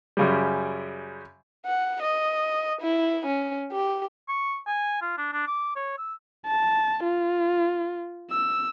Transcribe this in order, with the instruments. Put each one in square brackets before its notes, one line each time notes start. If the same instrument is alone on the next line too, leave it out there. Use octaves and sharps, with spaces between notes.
[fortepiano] F#2 C#3 G3
[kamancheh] F#5
D#5
E4
C#4
G4
[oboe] C#6
G#5
F4
D4
D4
D6
C#5
E6
[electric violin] A5
F4
E6